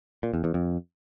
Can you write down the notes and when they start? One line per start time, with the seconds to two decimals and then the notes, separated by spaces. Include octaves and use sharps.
0.23 A#2
0.34 E2
0.44 E2
0.54 F2